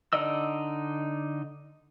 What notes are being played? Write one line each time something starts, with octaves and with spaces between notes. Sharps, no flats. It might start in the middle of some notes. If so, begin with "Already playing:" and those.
D3 D#4 D5 D#5 E6